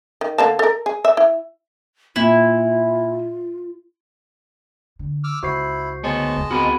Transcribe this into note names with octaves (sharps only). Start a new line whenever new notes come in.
D#3
D3 A#3 A5
A4 A#4
G#4
E5
E4
A#2 E4 F4
D3
D6 E6 F6
C#2 E4 F#4 C5 C7
D2 G#3 B3 C#5 D#5 A5
C#2 F#2
B3 C4 F#4 G#4 A#4 B5